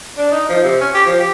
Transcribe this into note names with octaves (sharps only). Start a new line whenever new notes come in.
D4
D#4
F3
C3
C#4
G4
F3
G4